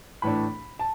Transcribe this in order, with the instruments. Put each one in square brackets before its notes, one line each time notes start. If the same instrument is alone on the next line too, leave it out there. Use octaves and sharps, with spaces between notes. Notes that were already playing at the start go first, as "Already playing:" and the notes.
[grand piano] A2 E3 A3 D4 B5
A5